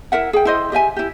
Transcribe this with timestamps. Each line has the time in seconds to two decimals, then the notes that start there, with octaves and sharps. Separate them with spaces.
0.12 E4 A#4 E5 F#5
0.33 G#4 G5
0.45 E4 C5 D#5
0.72 G4 D#5 E5 G#5
0.96 E4 G4